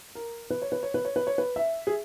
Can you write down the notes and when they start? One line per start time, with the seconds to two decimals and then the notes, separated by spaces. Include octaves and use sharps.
0.15 A#4
0.50 B4
0.62 C#5
0.72 B4
0.83 C#5
0.94 B4
1.05 C#5
1.16 B4
1.27 C#5
1.38 B4
1.56 E5
1.87 G#4